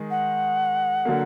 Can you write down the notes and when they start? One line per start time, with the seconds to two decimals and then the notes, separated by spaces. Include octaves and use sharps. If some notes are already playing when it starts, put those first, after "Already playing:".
Already playing: D#3 G#3
0.11 F#5
1.05 D3 F#3 A#3